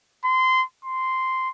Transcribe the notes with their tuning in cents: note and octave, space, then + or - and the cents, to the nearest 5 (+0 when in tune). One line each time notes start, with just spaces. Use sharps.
C6 -20
C6 -5